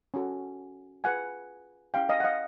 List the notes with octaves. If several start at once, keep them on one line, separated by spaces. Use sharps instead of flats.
C#4 F#4 A4
F4 G#4 B4 F#5 G#5
C#4 E4 G4 F5 G5
D#5 F5
F#5
D#5 F5